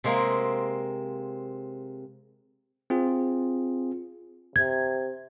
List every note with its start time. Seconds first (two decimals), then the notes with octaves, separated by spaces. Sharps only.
0.04 C3 G#3 A#3 C4
2.90 C4 F4 G#4
4.56 C3 G#6